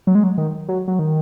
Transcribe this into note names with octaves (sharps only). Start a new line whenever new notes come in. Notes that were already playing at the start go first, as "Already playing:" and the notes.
F#3
G#3
F#3
D#3
F#3
F#3
D#3